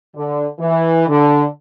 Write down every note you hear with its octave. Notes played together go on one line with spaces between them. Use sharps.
D3
E3
D3